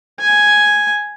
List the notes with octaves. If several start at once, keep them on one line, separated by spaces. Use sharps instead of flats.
G#5